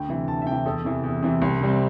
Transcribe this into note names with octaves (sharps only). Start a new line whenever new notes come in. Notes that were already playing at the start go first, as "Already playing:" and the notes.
Already playing: D2 G5
C3 E3
D2 A5
E5
C3 E3 G5
E2 A4
C3 E3
E2
C3 E3
C2
C3 G3 C4